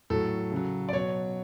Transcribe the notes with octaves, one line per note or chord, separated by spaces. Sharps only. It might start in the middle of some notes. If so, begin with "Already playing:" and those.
A2 F#3 A4
C#3 F#3
D5
B2 F#3 C#5